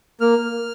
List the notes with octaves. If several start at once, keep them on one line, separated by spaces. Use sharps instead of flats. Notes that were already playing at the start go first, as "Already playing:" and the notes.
A#3 F6